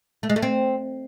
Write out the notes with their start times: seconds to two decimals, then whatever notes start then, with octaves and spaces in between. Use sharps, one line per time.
0.23 A3
0.30 G#3
0.36 A3
0.42 C4